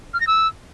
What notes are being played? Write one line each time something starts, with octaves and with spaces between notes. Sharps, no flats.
F6
A#6
E6